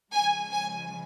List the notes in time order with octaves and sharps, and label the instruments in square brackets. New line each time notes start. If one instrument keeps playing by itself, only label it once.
[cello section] C#3 F3 G#3 [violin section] G#5
[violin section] G#5